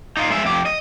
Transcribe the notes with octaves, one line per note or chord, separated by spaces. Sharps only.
D#4 F4
G#3 E5
F2 G4
D#5